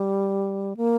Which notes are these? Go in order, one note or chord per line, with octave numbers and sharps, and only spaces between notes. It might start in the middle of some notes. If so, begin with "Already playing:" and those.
Already playing: G3
A#3